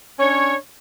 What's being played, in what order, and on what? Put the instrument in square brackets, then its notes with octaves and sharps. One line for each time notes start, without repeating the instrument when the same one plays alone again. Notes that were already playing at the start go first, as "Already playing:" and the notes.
[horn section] C#4 D4 C#5